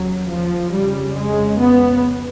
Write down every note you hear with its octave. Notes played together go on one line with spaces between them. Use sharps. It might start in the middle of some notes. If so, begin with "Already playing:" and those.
Already playing: D#2 C#3 F#3
F3
F2 C#3 G3
G#3
B3